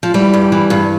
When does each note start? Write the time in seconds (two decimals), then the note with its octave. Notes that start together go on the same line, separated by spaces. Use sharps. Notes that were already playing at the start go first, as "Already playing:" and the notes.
0.03 F3
0.14 E3 G3
0.34 G2
0.52 E3
0.70 G2